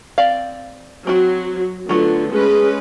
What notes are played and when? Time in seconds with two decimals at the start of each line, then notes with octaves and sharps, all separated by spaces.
0.18 C4 D5 F5
1.07 F#3 C4 F#4
1.89 D3 F#3 A3 B3 F4
2.32 G#3 C#4 G#4 B4